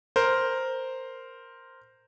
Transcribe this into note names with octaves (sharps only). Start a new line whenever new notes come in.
A#4 C5